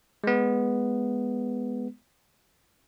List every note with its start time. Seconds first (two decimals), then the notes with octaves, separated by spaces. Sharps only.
0.24 G#3 B3